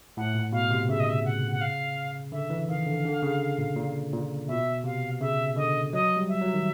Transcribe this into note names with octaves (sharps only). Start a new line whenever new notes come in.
A2 F#5
A#2
B2 F5
C3
C#3 E5
D#5
E5
F#5
F#5
F5
D3 E5
E3
D#3 F5
D3
D3
C#3
A#2
A#2
A#2
B2 E5
C3 F5
C#3 E5
D3 D#5
F#3 D#5
G3
E5
F#3
D#3